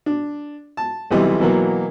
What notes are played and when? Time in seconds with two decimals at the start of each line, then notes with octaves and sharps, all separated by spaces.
0.06 D4
0.77 A5
1.11 B1 C3 E3 G3 D#5
1.40 B2 E3 F#3 A#3